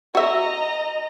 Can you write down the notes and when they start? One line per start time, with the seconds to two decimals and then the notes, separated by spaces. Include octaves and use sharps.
0.15 F#4 D#5 E5 A#5